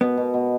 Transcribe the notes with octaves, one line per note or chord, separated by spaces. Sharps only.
B2 B3
B2
B2